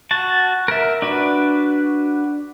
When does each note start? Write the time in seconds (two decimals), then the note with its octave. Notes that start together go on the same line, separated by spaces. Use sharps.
0.11 F#4 A5
0.68 A#4 E5
1.02 D4 F#4 B4